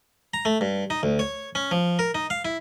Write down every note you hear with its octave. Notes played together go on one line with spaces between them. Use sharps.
A#5
A3
G2
D#4
D2
C#5
C#4
F3
A#4
D#4
F5
E4